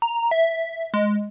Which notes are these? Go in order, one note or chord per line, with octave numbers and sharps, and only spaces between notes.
A#5
E5
G#3